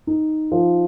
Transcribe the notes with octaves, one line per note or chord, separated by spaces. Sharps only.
D#4
F3